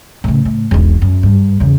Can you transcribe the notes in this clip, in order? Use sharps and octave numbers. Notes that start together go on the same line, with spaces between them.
A2 C#3
A2
E1 B1
F#2
G2
E2 C#3